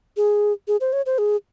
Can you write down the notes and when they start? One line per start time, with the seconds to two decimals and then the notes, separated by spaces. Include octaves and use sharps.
0.17 G#4
0.68 G#4
0.81 C5
0.93 C#5
1.06 C5
1.18 G#4